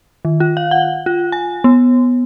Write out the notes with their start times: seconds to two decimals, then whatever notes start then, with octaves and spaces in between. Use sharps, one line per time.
0.25 D#3
0.40 F4
0.57 F5
0.71 F#5
1.06 F4
1.32 G#5
1.64 B3